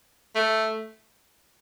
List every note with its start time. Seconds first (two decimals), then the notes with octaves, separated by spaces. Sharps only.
0.35 A3